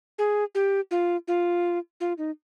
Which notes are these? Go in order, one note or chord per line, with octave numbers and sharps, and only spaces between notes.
G#4
G4
F4
F4
F4
D#4